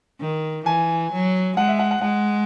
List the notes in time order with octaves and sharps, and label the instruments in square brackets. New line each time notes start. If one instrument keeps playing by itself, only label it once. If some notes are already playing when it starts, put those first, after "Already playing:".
[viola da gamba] D#3
[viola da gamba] E3 [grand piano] G#5
[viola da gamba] F#3
[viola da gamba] G#3 [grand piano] F#5
[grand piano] E5
F#5
F#5
[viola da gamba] G#3 [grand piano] F#5